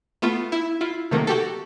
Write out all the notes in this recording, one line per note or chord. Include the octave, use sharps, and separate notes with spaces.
A3 B3 F4
E4
E4 F4
C3 D#3 F#3 A3 A#3
F#4 G4 A4